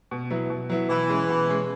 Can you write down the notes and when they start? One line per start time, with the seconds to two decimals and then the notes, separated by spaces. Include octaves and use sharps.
0.11 B2
0.30 F#3 B3 E4
0.50 B2
0.70 F#3 B3 E4
0.89 B2 E3
1.09 G#3 C#4
1.29 B2
1.49 G#3 C#4